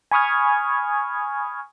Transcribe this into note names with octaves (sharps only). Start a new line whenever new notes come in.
G#5 B5 C#6 D#6 F6 G#6